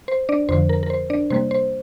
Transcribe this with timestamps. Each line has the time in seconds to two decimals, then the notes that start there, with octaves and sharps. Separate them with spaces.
0.08 C5
0.29 D4 D5
0.49 F2 D3 F3 C5
0.69 A#4
0.83 A#4
0.90 C5
1.10 D4 D5
1.30 C3 G3 A#3 C5
1.51 C5